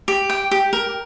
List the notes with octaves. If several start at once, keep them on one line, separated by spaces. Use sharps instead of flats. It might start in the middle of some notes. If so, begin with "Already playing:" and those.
G4
G5
G4
A#4